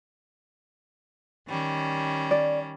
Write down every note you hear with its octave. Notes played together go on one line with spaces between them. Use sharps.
D#3 G3 C#4
D5